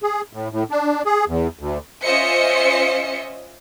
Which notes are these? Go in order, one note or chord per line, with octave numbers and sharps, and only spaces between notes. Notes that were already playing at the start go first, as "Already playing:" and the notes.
G#4
A2
A2
D4
G#4
E2
D2
C#4 F4 C5 D#5 E5 C#7